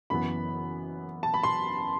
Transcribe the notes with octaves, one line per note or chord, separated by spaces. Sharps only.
F#1 F#2 E3 B3 B5
A5
B5
C6